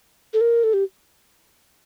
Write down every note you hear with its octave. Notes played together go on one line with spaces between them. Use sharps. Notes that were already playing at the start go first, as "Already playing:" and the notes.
A4
A#4
A4
G4